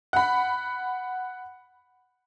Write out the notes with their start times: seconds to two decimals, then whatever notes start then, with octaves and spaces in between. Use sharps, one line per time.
0.13 F#5 B5